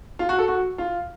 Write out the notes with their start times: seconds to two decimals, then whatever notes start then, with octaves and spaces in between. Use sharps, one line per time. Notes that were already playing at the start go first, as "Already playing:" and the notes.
0.19 F4
0.29 F#4
0.38 A4
0.48 F#4
0.78 F4